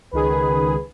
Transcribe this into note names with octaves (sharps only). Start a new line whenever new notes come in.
C#2 D#3 G#4 B4